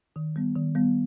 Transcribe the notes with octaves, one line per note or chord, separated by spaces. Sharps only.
D#3
G3 B3
D#3
G3 B3